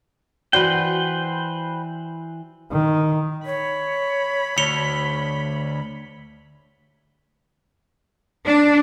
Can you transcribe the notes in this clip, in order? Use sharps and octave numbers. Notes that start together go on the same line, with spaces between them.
E3 F#4 B4 C5 D5 G5
D#3
C#5 B5
D2 C#5 C#7 F7 G7
D4